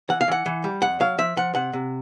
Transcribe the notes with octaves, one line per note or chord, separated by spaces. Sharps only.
E3 F#5
F5
E3 F#5
E3
G3
F2 F#5
F#3 F5
F3 E5
F3 F#5
C3 F#5
C3